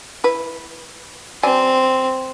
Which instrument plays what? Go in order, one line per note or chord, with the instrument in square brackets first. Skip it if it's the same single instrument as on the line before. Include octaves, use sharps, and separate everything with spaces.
[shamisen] E4 B4
[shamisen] F#3 D5 G#5 [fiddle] C4